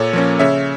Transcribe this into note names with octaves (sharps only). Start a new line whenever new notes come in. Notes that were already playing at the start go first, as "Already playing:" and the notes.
Already playing: A#2 A4 C#5
F3 A#3 C#4
C#3 C#5 E5